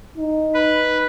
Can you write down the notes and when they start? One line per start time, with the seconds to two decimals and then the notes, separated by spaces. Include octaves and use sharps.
0.17 D#4
0.54 B4